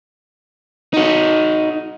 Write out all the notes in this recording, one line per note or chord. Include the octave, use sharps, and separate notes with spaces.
D#4 F#4